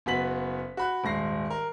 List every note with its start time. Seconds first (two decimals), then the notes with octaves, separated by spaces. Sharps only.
0.06 F#1 B3 F#4 B6 F#7
0.77 F#4 B5 F#6
1.04 D#1 G#2 A#6 C7
1.50 A#4